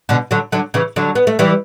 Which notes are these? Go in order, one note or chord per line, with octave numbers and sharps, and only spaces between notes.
B2 D3
D3 F#3
D3 F#3
C#3 E3
D3 F#3
B3
A3
E3 G3